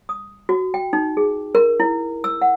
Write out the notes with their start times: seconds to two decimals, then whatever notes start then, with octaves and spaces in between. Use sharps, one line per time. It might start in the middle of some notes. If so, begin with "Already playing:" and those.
0.09 D#6
0.49 F#4
0.74 G5
0.93 D#4
1.17 G#4
1.55 A#4
1.80 E4
2.24 E6
2.42 F#5